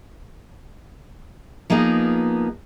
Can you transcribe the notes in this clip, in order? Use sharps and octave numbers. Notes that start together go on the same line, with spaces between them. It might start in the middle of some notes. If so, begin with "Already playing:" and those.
F3 A#3 B3 D#4 G#4